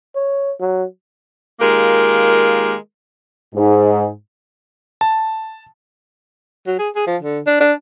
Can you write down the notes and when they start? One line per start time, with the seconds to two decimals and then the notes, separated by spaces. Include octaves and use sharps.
0.16 C#5
0.60 F#3
1.60 D#3 G#3 A#3 F4 G4 A#4
3.55 G#2
5.01 A5
6.67 F#3
6.79 G#4
6.95 G#4
7.07 F3
7.22 D3
7.47 D4
7.60 D4